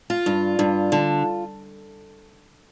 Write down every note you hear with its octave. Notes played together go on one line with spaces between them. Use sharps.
F4
G2
G2
D3